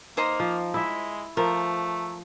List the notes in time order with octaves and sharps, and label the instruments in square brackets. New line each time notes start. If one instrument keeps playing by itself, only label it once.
[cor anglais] A#3 [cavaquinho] D#4 C5 D#6
[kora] F3
[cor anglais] G#3 [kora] E4 E5
[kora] F3 [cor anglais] A3 [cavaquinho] A#4